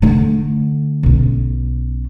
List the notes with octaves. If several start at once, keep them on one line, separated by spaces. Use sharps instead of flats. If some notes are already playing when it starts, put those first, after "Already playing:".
D3 A3
B1 C#4